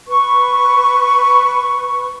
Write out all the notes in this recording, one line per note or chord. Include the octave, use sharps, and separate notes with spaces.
B4 C#6